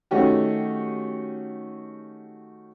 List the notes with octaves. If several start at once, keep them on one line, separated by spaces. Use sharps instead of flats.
D#3 A3 C#4 F#4 G4